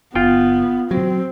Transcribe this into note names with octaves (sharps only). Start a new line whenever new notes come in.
F#1 B3 F4 G5
F#3 C4